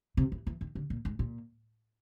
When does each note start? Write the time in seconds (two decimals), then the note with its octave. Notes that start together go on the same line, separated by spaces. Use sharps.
0.17 C3
0.32 E3
0.46 E3
0.61 D#3
0.75 D3
0.90 A#2
1.05 G#2
1.19 A#2